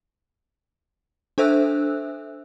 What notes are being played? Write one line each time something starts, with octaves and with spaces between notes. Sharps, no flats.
D4 A4 C5 E5 E6 F#6